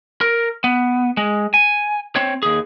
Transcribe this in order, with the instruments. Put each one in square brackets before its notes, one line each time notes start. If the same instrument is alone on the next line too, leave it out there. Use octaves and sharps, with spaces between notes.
[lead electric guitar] A#4
B3
G#3
G#5
C4 C#5
D#2 G#4